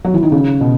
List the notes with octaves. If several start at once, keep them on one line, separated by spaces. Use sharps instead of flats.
F#3
E3
D#3
C#3
B2